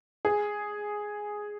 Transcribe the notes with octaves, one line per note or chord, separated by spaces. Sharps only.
G#4